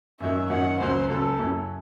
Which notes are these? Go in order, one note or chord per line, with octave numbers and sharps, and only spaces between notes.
F#2 D#3 F#3 C#4 E5
F#2 D#3 F#3 C#4 F#5
C#2 C#3 F#3 C5
C#2 C#3 F#3 A4
F#2 C#3 F#3 C#4 E4